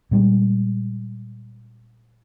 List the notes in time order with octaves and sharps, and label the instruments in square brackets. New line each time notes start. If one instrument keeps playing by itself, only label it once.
[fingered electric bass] A#2 G3 G#3